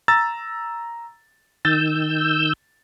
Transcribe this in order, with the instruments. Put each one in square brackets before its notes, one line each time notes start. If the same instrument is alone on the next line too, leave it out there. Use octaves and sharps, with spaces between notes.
[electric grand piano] A#5 E6 A6
[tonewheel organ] D#3 E6 G6 [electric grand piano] A6